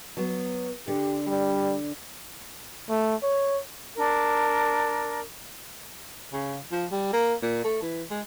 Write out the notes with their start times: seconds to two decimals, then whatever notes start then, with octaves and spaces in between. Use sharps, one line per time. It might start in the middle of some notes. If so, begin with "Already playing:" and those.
0.17 F#3 B3
0.88 D3 G4
1.27 G3
2.90 A3
3.23 C#5
3.95 D4 A#4
6.33 C#3
6.72 F3
6.92 G3
7.13 A#3
7.42 A#2
7.64 A3
7.82 E3
8.11 G#3